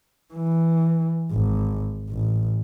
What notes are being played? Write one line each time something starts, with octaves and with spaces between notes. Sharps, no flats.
E3
G#1
A1